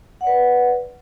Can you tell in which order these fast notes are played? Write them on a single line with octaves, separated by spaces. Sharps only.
F#5 D5 B4